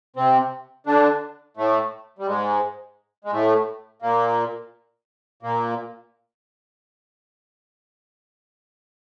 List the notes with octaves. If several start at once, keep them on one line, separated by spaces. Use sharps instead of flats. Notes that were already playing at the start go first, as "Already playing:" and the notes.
C3 C4
D3 D4
A2 A3
G3
G#2 G#3
G#3
A2 A3
A#2 A#3
A#2 A#3